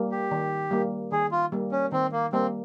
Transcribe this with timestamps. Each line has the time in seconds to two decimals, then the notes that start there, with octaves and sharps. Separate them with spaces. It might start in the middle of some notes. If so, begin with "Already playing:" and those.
Already playing: G3 A#3
0.12 G4
0.31 D#3
0.71 G3 A#3
1.12 D#3 G#4
1.31 F4
1.52 G3 A#3
1.72 C#4
1.92 D#3 C4
2.12 A#3
2.33 G3 A#3 C4